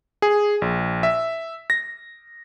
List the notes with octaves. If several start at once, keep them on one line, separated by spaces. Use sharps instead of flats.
G#4
A#1
E5
A#6